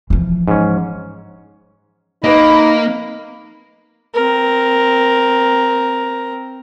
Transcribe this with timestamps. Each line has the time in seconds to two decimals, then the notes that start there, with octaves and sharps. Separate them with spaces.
0.10 E3 F3
0.48 G#2 C#4
2.24 A#3 D#4 B4 D#5 B5
4.14 C4 A#4